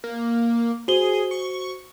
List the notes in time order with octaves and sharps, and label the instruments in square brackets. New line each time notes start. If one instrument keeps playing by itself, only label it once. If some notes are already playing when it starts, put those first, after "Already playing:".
[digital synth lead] A#3
[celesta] F#4 C5 G7 [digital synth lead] G#4
[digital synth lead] C#6